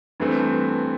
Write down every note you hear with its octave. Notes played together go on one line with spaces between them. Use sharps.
G2 E3 A3 C4